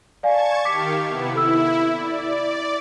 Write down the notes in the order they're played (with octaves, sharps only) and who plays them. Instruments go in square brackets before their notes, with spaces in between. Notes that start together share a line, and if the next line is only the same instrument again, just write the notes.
[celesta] D5 F5 G#5 [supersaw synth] A5 C#6 G#6
[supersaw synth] D#3 G4 F5 [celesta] D6 B6 C#7
[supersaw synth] C3 B3 E4
[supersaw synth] E4 [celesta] A4 E6
[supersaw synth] D5